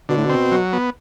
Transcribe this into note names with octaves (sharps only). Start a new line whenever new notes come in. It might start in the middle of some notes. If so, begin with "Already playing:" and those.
B2 D3
A2
B2 C4
F#3
B3